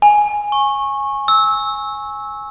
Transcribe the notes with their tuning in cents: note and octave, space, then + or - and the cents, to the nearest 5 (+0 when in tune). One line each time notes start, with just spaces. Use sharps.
G#5 +0
C#6 -20
E6 -20